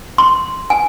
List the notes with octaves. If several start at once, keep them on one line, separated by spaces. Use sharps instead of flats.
C6
G#5